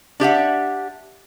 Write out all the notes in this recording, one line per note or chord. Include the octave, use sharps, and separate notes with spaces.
D4 G4 E5 F#5